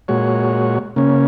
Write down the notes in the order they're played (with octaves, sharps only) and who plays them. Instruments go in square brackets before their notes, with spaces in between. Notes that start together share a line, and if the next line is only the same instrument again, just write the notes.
[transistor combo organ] A#2 G#3 F#4 C#5
C#3 A#3 C#4